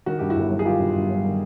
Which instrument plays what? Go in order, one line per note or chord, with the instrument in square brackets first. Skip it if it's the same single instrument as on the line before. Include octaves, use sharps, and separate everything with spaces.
[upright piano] D#3 F#4
G2 G4
E4 F#4
G1
F#3
G#4
D#3 F4 G4
G2
G1
F#3
D#3